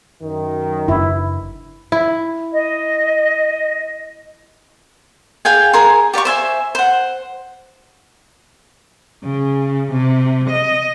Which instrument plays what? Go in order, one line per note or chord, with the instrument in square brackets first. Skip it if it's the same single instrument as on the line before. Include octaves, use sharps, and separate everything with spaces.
[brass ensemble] F#2 D#3
[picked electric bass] F#1 D4 [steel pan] E4
[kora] E4
[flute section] D#5
[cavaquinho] G#4 F5 G5 G#5
G#4 A#4 G#5 C6
G4 D5 F5 C#6
C5 E5 G#5
C5 F#5
[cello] C#3
C3
D#5